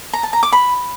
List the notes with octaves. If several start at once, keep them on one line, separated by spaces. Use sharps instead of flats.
A#5
A5
A#5
D6
B5